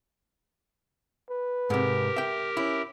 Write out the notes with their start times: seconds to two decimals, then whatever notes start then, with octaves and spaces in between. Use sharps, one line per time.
1.30 B4
1.70 G#2 C3 G4 A#4
2.16 E5 G5
2.57 C#4 E4